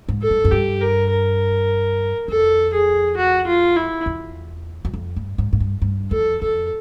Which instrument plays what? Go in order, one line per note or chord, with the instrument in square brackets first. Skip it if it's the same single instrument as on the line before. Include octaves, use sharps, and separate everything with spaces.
[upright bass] G#2
[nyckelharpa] A4
[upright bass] G2
F#2
[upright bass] G2 [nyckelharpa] G4
[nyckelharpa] A#4
A#4
[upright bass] F2 [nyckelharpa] A4
[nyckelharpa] G#4
F#4
F4
E4
[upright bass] E2
F#2
F2
G2
G#2
G#2
G2
G2
[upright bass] F2 [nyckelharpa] A4
[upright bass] F2 [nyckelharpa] A4